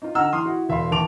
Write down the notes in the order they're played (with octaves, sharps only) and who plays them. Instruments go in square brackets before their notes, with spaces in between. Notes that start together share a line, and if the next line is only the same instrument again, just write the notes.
[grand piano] D#4 F4
D3 D#4 F#5 A#5 E6 F6
E3 C6 D#6 F6
E4 F#4
E1 E5 F5 B5 C6
A1 D#2 A5 D6 D7 F7